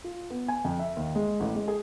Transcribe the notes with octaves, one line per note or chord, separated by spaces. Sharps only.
F4
B3
G#5
F2
E5
D#2
G#3
A1
G#3
G#4